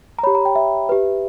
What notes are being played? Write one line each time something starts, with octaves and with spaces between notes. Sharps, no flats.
A#5
G4 C#5 B5
A#5
G5
E5
G4 B4